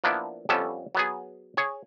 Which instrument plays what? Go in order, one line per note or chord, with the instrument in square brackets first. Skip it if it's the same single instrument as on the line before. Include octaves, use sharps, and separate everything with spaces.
[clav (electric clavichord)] F3 A#3 B3 D4 E4
F2 G3 B3 C#4 A4 A5
F#3 B3 G#4
G#4 C#5